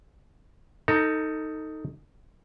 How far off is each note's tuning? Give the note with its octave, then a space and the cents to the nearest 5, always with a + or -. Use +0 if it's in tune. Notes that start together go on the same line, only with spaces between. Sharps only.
D#4 +5 A4 +25 A#5 +0